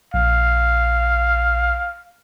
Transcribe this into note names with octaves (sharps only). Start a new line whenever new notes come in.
A#1 F5